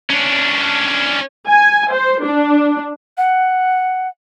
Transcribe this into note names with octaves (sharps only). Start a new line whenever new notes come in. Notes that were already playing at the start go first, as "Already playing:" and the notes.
C#4 D4
G#5
C5
D4
F#5